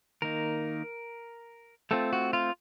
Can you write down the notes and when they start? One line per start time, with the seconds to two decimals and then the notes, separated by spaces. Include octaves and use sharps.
0.22 D#3 A#3 D#4 A#4
1.91 A3 C4 F4 A4
2.13 F#4
2.33 F4